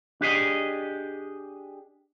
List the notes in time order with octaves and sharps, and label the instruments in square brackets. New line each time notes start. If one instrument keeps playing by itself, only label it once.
[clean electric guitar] D4 G4 G#4 D#5